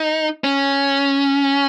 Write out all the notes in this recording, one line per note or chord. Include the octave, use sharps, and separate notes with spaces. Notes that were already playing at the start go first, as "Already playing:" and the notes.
Already playing: D#4
C#4